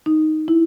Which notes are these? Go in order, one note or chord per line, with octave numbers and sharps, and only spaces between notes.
D#4
E4